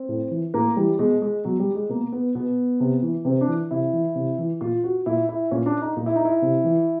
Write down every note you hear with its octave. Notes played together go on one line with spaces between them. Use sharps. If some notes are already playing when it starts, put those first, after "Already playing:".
Already playing: C4
A2
E3
A2 A#3
E3 G3
B2 G#3
G#3
B2 F#3
G3
G#3
B2 A#3
B3
B2 B3
C3
E3
C3 C4
D4
E3
C3 E4
E3
C3
E3
A#2 F4
F#4
A#2 E4
E4
A#2 C#4
D4
D#4
A#2 F4
E4
D#4
E4
C3
E3